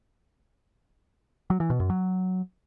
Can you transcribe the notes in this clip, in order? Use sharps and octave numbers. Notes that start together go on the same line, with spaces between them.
F#3
E3
B2
F#2
F#3